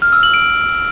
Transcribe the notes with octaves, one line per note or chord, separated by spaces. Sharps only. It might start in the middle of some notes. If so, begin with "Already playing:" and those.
F6
E6
F#7
D7